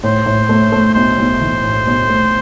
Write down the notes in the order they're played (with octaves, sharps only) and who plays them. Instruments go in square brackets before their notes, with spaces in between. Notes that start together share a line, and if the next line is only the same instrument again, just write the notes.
[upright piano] A2 [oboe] C5
[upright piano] A2
A3
A3
[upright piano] B1 [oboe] C5
[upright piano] B1
E3
A2
B1
A3